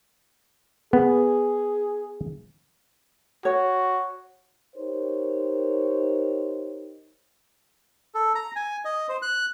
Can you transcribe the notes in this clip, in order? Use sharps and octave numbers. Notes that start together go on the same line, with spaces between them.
B3 G#4
F#4 C#5
D#4 G4 A#4 C5 C#5
A4
A#5
G#5
D#5
C5
F#6